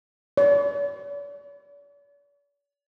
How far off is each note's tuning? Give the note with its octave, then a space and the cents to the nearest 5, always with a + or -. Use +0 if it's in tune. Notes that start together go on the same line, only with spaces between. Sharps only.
D5 -45